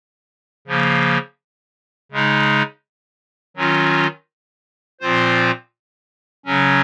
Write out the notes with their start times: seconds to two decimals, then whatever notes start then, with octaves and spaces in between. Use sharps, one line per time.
0.67 C#3 F3 A#3
2.12 C#3 G#3 D#4
3.57 D#3 F#3 C#4 F4
5.00 A#2 F3 C4 F4 C5
6.45 C#3 F#3 C#4